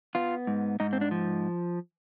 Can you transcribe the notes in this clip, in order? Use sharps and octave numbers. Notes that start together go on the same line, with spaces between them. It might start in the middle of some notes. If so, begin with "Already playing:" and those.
B3 F4
G#2
G#2 D#4
C4
D4
F3